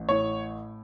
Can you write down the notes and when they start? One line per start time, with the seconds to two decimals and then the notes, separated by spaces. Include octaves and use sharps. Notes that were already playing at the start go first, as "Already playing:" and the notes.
Already playing: A1
0.09 A2 C#5